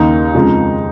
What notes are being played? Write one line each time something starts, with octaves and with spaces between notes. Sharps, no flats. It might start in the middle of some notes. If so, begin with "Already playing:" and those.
Already playing: D#2 C#3 A#3 D#4
F2 C#3 F3 G#3